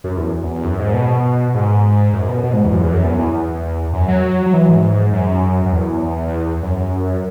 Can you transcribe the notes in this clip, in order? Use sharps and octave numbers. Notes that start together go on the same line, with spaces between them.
F#2
E2
E2
F#2
G#2
B2
G#2
F#2
B2
B2
G#2
E2
F#2
E2
F#2
E2
E2
F#2
F#3
F#3
E3
G#2
F#2
F#2
E2
F#2